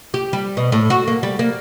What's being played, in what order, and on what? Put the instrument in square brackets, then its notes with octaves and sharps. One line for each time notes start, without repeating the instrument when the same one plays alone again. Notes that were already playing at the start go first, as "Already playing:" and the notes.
[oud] G4
G3
B2
A2
F#4
A#3
G3
A#3